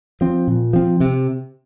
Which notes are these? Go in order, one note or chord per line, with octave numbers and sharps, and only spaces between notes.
F3 C4
A#2
F3 C4
C3